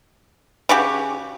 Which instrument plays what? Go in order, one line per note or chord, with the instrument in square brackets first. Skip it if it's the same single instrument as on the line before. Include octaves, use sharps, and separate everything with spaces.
[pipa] C#3 F#4 G4